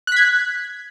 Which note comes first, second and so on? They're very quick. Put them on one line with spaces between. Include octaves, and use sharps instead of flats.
F#6 B6 G#6